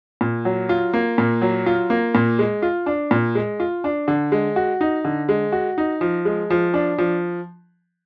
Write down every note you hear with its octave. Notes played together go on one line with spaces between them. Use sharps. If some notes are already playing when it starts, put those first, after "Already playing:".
A#2
F#3
F4
A#3
A#2
F#3
F4
A#3
A#2
G#3
F4
D4
A#2
G#3
F4
D4
D3
G#3
F#4
D#4
D3
G#3
F#4
D#4
F3
G#3
F3
D4
F3